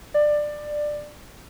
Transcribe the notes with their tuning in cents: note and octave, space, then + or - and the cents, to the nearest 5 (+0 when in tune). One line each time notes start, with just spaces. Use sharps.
D5 +15